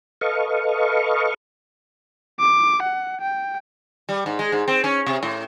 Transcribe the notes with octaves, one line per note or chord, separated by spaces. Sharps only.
A4 B4 D#5 F5 C#6
D6
F#5
G5
G3
G#2
G#3
G#2
C4
C#4
C3
A2